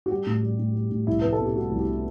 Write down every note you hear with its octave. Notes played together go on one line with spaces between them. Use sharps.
F#4
G3 G4
A2
G3
A2
G3
A2
C2 E4
C2 B4
A4
B2
G4
G3 F#4
C2
G4